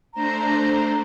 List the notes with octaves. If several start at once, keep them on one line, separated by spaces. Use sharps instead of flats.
A3 D4 C5 A#5